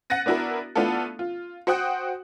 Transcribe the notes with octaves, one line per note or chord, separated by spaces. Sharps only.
F#5 F#6 A6 A#6 D#7
B3 D4 E4 F#4 A#4
A3 B3 D4 E4 F4 A4
F4
F#4 C5 F#5 G5 D#6 F#6